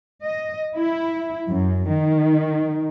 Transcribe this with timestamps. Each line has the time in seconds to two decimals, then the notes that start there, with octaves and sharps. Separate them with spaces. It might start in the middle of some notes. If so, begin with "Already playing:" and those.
0.23 D#5
0.75 E4
1.48 F#2
1.90 D#3